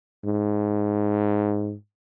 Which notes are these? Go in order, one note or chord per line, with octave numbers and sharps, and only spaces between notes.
G#2